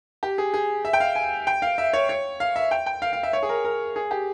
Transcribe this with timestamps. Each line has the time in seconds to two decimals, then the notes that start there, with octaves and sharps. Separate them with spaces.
0.23 G4
0.38 G#4
0.54 G#4
0.85 E5
0.93 G5
1.00 F5
1.15 G#5
1.47 G5
1.62 F5
1.78 E5
1.93 C#5
2.09 C#5
2.40 F5
2.56 E5
2.71 G5
2.86 G5
3.02 F5
3.13 F5
3.23 E5
3.33 C#5
3.43 G#4
3.49 A#4
3.65 A#4
3.96 G#4
4.11 G4